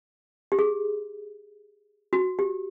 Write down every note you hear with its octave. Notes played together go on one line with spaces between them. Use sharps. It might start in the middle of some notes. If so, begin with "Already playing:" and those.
G4
G#4
F#4
G4